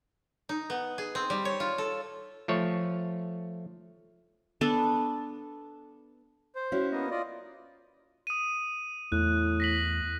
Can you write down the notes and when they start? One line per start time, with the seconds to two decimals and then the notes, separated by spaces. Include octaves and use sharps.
0.49 D#4
0.70 B3
0.98 G#4
1.15 C4
1.30 G3
1.45 C#5
1.60 F4
1.78 A4
2.48 F3 A3 C#5
4.61 B3 D4 A4
6.56 C5
6.72 C#4 E4 F#4
6.92 A#3 B3 D#5
7.11 F4 D5 D#5
8.27 D#6 D#7
9.12 E2 A2 F#6
9.60 A#6 B6 F#7